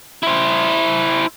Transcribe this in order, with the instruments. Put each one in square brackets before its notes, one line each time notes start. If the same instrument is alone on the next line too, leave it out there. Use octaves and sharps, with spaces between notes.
[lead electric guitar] E4 C5